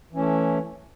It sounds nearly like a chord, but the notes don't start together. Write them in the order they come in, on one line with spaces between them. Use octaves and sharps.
E3 C#4 A3